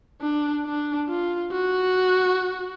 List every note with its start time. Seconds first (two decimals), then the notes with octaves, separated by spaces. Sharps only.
0.21 D4
0.65 D4
1.08 F4
1.52 F#4